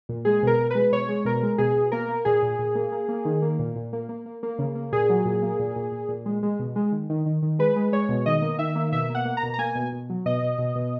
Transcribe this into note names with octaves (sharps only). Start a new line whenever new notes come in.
A#2
G#3 G#4
B2 A#4
B2
G#3 B4
B2 C#5
G#3
B2 A#4
G#3
B2 G#4
B2
A#3 A#4
A#3
A#2 G#4
A#2
A#2
A#3
A#3
A#3
D#3
A#3
A#2
A#2
A#3
A#3
A#3
A#3
C#3
A#3
A#2 G#4
F#3
A#2
A#3
A#2
A#2
A#2
A#2
G#3
G#3
B2
G#3
D#3
D#3
D#3
D#3
G#3 B4
G#3
G#3 C#5
B2
D#3 D#5
A#3
D#3 E5
A#3
B2 E5
A#3
F#5
A#3
A#5
B2
A#5
A#3 G#5
B2
B2
F#3
B2 D#5
B2
B2
B2